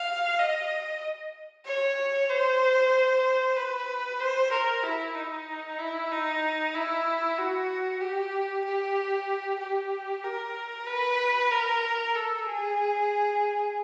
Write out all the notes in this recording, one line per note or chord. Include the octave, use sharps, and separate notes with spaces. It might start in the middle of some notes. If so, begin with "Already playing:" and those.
Already playing: F5
D#5
C#5
C5
B4
C5
A#4
E4
D#4
E4
D#4
E4
F#4
G4
G4
G4
A#4
B4
A#4
A4
G#4